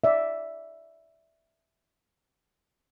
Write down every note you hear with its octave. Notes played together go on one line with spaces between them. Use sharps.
D5 E5